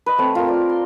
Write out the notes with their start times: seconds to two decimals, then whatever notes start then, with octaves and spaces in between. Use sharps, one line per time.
0.06 B4 D#5
0.18 A3 C4
0.35 F4 A#4
0.48 D5
0.69 C6